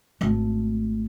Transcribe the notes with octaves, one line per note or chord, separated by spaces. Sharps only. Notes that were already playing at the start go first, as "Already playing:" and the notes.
G#1 A3